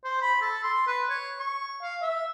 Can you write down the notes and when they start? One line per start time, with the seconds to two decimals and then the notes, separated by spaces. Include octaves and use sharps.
0.04 C5
0.22 B5
0.42 A4
0.64 C6
0.87 B4
1.10 C#5
1.39 C#6
1.83 F5
2.02 E5